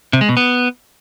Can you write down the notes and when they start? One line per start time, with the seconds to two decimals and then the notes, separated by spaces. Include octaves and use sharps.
0.13 C3
0.21 G#3
0.29 B2
0.37 B3